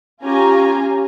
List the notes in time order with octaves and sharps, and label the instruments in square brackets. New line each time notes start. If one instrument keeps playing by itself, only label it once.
[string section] C#4 F4 G4 G#5 A#5